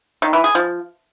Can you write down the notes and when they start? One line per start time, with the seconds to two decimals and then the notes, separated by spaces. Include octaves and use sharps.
0.22 D#3
0.33 E3
0.44 G#4
0.55 F3